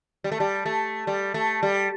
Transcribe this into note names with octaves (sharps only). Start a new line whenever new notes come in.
G3
A3
G3
A3
G3
A3
G3